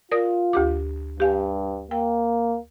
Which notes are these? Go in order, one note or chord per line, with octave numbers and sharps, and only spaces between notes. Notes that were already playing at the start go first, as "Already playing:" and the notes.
F4 A#4 D5 D#6
D2 G4 D6
G2 G4 F5 G#5
A#3 G5